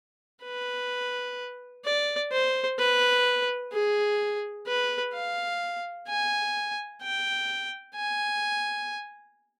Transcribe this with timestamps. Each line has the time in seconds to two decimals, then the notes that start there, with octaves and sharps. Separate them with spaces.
0.44 B4
1.85 D5
2.32 C5
2.78 B4
3.72 G#4
4.67 B4
5.13 F5
6.08 G#5
7.02 G5
7.96 G#5